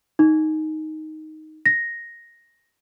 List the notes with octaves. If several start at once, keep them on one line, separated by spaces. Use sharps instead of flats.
D#4
A#6